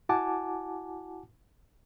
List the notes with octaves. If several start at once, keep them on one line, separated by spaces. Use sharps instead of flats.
E4 F#4 F#5 G#5 A5 D6